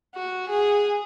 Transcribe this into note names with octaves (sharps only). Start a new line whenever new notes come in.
F#4
G#4